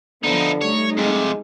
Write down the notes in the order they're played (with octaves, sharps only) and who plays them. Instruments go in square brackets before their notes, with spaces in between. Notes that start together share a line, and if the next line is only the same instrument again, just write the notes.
[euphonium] D3 [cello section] F3 B3 [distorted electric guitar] D#4 E4
[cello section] G3 A3 D#4 [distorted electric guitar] C#5
[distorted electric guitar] F2 C3 [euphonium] G#3